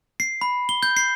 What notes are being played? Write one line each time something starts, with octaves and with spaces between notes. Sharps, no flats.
C7
B5
G7
G6
C7